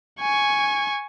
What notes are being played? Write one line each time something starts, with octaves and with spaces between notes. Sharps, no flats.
G#5 C#6